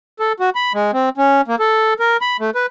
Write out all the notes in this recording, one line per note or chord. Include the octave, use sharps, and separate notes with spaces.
A4
F#4
B5
G#3
C4
C#4
A#3
A4
A#4
B5
A3
B4